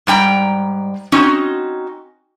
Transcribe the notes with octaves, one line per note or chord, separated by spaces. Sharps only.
G#2 G3 G5 A#5
C4 C#4 D#4 F#4